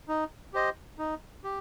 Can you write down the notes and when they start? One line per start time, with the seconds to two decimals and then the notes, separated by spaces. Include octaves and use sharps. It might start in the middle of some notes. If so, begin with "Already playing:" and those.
0.08 D#4
0.54 G4 C5 D#5
0.99 D#4
1.44 G4